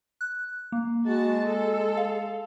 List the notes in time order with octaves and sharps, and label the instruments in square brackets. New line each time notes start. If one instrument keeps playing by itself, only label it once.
[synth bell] F#6
A#3
[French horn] G#3 [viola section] F#4 A5
[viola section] A4
[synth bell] F5